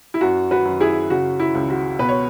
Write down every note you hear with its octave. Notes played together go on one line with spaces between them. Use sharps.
E4
F#2 F#4
F#4 B4
F#2
E4 G#4
C#3 F#4
E4
C#2
F#4
B2 B4
C#5